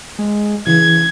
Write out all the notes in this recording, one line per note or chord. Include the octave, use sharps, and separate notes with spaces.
G#3
C#3 E3 G#6